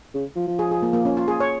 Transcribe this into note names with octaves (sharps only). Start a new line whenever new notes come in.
C#3
F3
F3
G#4
G#4
A#3
A#3
C#4
F4
G#4
C#5